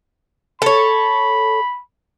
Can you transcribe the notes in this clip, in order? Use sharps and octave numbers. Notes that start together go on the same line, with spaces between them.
A4 C#5 B5